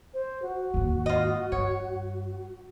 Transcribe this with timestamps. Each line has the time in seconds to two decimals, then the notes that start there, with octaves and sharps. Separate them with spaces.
0.14 C5
0.42 F#4
0.74 D#2 G#2
1.06 F4 D#5
1.52 G2 C#5